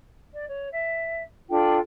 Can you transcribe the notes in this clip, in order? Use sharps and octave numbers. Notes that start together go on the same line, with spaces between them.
D5
C#5
E5
D4 F4 A4 G5